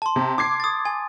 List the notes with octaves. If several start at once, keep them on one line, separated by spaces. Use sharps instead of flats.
A5 C6
C3
D6 G#6 C7
D#6 A6
G#5